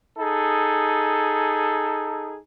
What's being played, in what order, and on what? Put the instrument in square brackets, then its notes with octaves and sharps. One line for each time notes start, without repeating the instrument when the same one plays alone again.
[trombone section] D#4 G#4 A4